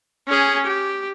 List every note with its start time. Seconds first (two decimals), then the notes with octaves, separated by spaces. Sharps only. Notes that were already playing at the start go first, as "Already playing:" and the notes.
0.27 C#4 G#4
0.66 G4